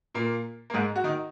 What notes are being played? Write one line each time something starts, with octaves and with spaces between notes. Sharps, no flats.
A#2 A#3
A#3
G#2 G#3
F#4
D#3 D#4